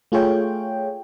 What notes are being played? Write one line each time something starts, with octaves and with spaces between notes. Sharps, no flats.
A3 F4 G#4 C#5 G5